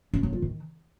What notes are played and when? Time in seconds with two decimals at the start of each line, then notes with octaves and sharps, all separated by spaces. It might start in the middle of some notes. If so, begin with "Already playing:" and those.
0.14 C#4
0.23 F#3
0.33 F4
0.42 D#3